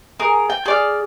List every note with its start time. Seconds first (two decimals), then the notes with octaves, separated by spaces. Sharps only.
0.20 G#4 A#4
0.50 G5
0.66 G#4 D5 F6